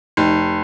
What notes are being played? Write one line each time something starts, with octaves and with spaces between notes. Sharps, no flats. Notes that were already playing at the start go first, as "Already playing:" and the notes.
F1 D#4 G4